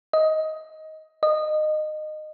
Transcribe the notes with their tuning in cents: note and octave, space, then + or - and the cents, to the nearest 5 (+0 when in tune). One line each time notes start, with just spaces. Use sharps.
D#5 +15
D#5 -20